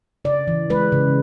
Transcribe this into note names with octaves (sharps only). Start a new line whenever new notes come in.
C#3 D5
E3
G#3 B4
C#3